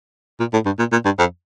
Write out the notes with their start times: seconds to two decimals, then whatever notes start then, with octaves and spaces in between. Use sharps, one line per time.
0.40 A#2
0.53 A2
0.66 G2
0.79 A#2
0.92 A#2
1.05 G2
1.19 F2